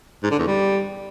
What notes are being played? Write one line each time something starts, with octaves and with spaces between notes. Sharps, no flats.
G#2
D3
E2
G3